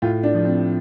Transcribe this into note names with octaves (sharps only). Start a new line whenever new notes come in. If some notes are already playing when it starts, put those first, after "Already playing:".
A2 F4
D4
F3
C4